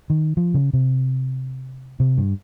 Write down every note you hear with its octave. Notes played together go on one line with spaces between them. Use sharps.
D#3
F3
C#3
C3
C3
G2